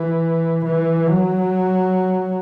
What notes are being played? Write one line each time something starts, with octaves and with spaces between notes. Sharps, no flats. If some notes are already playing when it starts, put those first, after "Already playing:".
Already playing: E3
E3
F#3